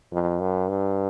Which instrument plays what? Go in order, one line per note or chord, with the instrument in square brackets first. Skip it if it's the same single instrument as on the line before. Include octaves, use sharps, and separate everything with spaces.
[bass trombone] F2
F#2
G2